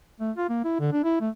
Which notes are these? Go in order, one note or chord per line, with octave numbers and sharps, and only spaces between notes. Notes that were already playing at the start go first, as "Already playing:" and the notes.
A3
F4
A#3
E4
D3
D4
E4
A3